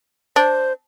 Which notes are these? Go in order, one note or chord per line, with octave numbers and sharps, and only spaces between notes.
D4 C5